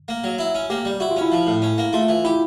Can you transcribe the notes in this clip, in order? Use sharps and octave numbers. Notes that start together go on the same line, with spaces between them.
A#3
F#3
E4
C#4
A#3 G4
G3
E4 F#4
F4
C#4 E4
F3
A2
C#4
A#3
A3 F4
E3
E4 G4